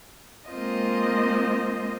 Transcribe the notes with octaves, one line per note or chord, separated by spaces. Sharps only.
G#3 A#3 C4 F4 D#5